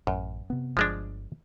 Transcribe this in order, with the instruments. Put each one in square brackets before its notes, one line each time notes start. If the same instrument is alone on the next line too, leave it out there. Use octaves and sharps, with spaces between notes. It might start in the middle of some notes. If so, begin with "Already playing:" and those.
[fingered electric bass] A1 [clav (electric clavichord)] F#2
[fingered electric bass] C3 B3
[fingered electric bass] G1 [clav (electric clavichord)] F3 G#3 D4